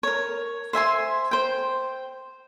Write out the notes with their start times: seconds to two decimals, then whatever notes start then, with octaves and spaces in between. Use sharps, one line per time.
0.03 A#4 C#5
0.73 C5 E5 G#5 C6
1.31 C5 G5